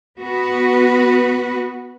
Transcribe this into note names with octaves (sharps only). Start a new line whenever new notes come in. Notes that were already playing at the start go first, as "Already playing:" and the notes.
B3 F#4 B4